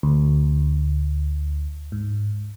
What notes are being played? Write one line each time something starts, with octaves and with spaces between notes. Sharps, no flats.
D2
G#2